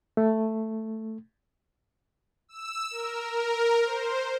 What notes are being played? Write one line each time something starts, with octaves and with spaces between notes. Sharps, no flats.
A3
E6
A#4
A#4
C5